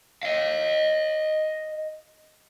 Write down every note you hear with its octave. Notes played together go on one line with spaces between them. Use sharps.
D#5 F5